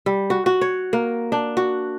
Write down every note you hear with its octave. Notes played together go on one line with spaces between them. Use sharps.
G3
F#4
F#4
C#5
A#3
D4
F#4